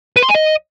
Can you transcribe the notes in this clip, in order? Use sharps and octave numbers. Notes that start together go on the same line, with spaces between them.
B4
C6
G#5
D#5